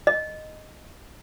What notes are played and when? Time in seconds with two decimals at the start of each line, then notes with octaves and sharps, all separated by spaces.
0.07 D#5